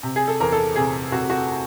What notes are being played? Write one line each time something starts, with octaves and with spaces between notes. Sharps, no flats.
C3
G#4
A4
E2 A#4
A4
C3 G#4
C3 F#4
F#4